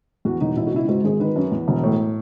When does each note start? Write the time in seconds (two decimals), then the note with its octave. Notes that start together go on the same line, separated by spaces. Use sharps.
0.25 E2 F#4
0.41 E1 D#4
0.56 B2 E4
0.67 F#4
0.72 C#2 E4
0.88 G#2 F#4
1.04 G#1 G#4
1.20 D#3 B4
1.36 F#2
1.52 E2
1.68 E1
1.83 A2